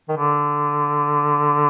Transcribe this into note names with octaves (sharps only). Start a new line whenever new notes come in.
D#3
D3